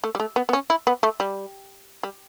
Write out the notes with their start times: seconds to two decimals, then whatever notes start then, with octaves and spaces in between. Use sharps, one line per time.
0.04 A3
0.15 G3
0.20 A3
0.36 B3
0.49 B3
0.53 C#4
0.70 E4
0.87 B3
1.03 A3
1.20 G3
2.03 G3